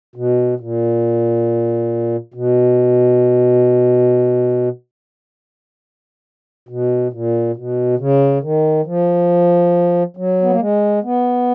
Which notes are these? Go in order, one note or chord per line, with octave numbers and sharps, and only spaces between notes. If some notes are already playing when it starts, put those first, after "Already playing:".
B2
A#2
B2
B2
A#2
B2
C#3
D#3
F3
F#3
B3
A#3
G#3
B3